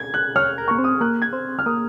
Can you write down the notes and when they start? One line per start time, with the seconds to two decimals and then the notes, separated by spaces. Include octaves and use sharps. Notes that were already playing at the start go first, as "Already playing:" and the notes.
Already playing: G#6
0.14 F#6
0.36 C#5 F6
0.58 A#4
0.68 A#3 C#6
0.78 C4
0.84 D#6
1.01 A#3 F#6
1.22 G#6
1.33 C4
1.59 F6
1.66 A#3 D#6